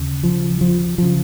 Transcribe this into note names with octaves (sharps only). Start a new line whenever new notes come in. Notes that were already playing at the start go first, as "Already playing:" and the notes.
Already playing: D#2 C#3
F3
F3
C#3 F3